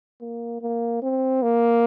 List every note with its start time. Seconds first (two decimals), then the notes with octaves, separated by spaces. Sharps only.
0.21 A#3
0.62 A#3
1.03 C4
1.43 A#3